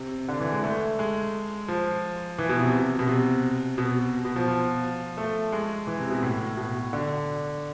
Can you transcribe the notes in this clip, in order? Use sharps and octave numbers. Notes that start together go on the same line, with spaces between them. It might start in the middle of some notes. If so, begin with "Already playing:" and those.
Already playing: C3
D3
E3
G#3
A3
G#3
F3
E3
B2
C3
B2
C3
B2
B2
F3
F3
A3
G#3
E3
C3
B2
A2
B2
D3